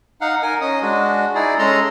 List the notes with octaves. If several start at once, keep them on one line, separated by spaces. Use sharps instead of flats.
D#4 F5 F#5
D#4 A#4 G#5
C#4 D#5 D#6
G#3 D4 F#4
D#4 E4 G#4 D5
G#3 C#4 A4 A#5 C6